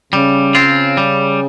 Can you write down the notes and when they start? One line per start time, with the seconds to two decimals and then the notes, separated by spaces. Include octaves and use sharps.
0.13 C#3 G3
0.55 C4 F4
0.97 G3